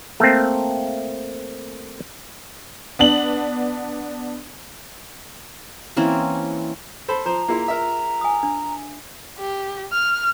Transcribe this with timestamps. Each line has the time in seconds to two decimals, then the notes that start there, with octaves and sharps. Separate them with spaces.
0.20 A3 A#3 C4
2.99 B3 D4 F#7
5.97 E3 A#3 C4 C#4
7.08 A4 C5 B5
7.25 F3 C5 A#5
7.48 A#3 E4 F4 G#4 C6
7.68 A#4 E5
8.21 G#5 D#6
8.43 D4
9.39 G4
9.92 F6